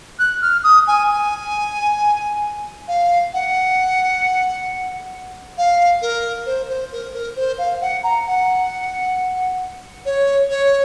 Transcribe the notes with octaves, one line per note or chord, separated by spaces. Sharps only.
F#6
F6
D#6
G#5
G#5
F5
F#5
F5
A#4
C5
C5
A#4
A#4
C5
F5
F#5
A#5
F#5
C#5
C#5